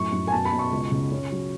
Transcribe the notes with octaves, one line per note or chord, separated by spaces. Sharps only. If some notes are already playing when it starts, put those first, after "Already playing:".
Already playing: F#2 A2 C#6
F#2
G#5
B2 A5
B5
B2
C#6
C#2
C#3
C#4
F#3